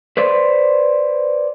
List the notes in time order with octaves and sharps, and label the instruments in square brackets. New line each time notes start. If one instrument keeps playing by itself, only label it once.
[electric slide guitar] B4 C5 D5